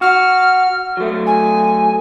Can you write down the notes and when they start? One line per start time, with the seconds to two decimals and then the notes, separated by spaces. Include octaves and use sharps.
0.01 F#4 F6
0.97 F#3 A3
1.26 G#5